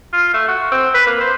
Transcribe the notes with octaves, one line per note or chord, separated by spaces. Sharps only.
F4
A3
F#4
C4
B4
A#3
C5